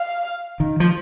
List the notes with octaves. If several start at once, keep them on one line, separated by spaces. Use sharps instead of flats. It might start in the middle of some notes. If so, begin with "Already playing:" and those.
Already playing: F5
D#3
F3